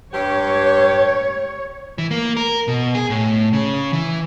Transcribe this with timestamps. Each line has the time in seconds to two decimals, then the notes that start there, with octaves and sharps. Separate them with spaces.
0.13 G2 G4 C#5
1.98 E3
2.11 A#3
2.37 A#4
2.68 B2
2.95 G#4
3.10 A2
3.53 C#3
3.93 E3